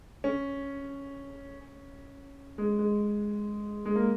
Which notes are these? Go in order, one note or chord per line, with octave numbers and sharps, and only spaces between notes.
C#4
G#3
G#3
G#3
A#3